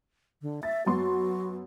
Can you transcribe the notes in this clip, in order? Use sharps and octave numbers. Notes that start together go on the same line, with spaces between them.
D3
E5 A6
F#2 B3 F#4 C6